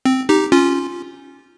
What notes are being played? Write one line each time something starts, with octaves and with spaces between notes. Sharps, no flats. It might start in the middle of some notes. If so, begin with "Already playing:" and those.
C4
D#4 G4
C#4 F4